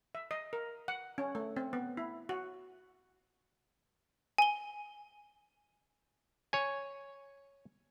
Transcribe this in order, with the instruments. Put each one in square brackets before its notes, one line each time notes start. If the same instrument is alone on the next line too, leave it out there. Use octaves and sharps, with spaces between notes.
[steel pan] E5
D#5
A#4
F#5
C#4
A3
C4
B3
E4
F#4
[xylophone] G#5 G7
[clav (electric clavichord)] C#5 G#5